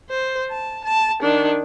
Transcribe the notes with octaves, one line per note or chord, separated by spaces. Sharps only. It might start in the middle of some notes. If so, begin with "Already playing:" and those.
C5
A5
A5
D#3 D4